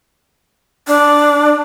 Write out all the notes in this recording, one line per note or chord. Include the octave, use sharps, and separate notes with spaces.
D4